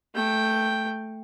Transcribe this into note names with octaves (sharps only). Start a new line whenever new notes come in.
A3 G5